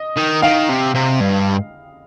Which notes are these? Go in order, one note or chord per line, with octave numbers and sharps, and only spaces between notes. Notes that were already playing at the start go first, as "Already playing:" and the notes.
Already playing: D#5
D#3
D#3 F5
C3
C3
G2